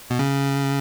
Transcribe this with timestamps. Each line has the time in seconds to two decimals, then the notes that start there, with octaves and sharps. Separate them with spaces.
0.10 B2
0.19 C#3